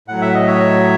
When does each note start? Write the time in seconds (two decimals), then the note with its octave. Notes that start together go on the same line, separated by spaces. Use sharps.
0.08 A2 F#3 F#5
0.22 E5
0.34 D#5
0.47 C#5 E5